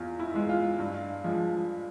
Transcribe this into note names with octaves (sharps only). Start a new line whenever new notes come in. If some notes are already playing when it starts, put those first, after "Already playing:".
Already playing: E2 F4
E4
E3 G#3
F4
G2
F3 G#3